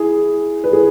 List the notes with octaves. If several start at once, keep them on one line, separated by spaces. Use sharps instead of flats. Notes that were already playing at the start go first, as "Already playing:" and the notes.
Already playing: E4 G#4
B4
E4 G#4